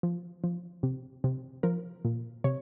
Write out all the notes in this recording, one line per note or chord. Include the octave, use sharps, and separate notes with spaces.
F3
F3
C3
C3
F3 A#4
A#2
C3 C#5